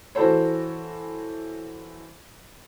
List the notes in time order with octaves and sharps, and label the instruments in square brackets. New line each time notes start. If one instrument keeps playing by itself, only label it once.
[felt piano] E3 F#4 A4 C5 C#5